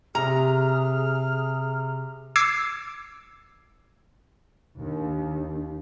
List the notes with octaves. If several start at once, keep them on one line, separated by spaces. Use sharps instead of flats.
C3 G#4 A#5 F6
D6 E6 G#6 C7 C#7
D#2 D4